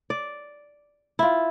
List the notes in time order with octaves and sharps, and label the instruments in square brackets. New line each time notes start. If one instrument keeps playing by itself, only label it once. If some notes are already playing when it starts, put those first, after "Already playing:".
[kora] D5
E4 F4